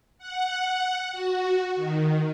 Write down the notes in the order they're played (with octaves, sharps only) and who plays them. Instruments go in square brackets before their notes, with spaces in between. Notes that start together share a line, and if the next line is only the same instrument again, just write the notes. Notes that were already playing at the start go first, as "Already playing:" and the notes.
[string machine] F#5
F#4
D#3